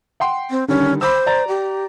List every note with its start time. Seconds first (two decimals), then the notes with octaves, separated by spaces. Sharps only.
0.20 F#5 G5 C6
0.50 C4
0.68 D3 D#3 G3 C#4
1.01 C5 B5 D6 E6
1.26 D5 A#5 A6
1.48 G4